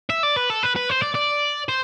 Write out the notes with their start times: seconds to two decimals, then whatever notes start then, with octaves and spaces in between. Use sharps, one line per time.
0.10 E5
0.23 D5
0.37 B4
0.50 A4
0.63 B4
0.76 B4
0.90 C5
1.02 D5
1.15 D5
1.69 C5